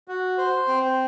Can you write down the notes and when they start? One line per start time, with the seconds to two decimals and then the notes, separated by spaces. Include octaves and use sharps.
0.08 F#4
0.38 C5
0.68 C4